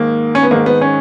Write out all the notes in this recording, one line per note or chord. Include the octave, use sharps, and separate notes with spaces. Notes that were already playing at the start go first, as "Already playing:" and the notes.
Already playing: G#2 D#3 A#3
C#4
B3
G#2 D#3 A#3
B3
C#4